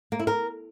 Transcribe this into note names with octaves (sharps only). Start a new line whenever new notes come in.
A#3
E4
A#4